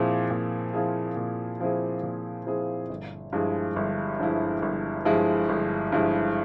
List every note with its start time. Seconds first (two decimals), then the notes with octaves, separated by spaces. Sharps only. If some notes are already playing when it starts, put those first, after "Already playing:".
Already playing: A#2 F3 C4 E4 G#4
0.31 A#2
0.73 F3 C4 E4 G#4
1.17 A#2
1.60 F3 C4 E4 G#4
2.03 A#2
2.46 F3 C4 E4 G#4
2.90 G1
3.33 G2 F3 G#3 E4
3.76 G1
4.19 G2 F3 G#3 E4
4.62 G1
5.05 G2 F3 G#3 E4
5.49 G1
5.92 G2 F3 G#3 E4